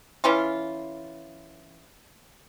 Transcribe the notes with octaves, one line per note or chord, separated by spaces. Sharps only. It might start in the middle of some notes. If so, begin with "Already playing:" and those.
E3 C#4 F4